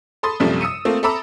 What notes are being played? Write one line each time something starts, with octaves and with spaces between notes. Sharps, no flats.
A4 B5 C6 D#6 A6
A#1 F#2 C3 F3 G3 A3
D#6 E6 C#7 D#7
A3 A#3 C4 F4
A4 E5 A#5 B5 D6 E6